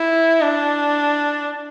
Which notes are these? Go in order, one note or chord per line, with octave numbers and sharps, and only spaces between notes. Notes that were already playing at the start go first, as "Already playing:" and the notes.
Already playing: E4
D4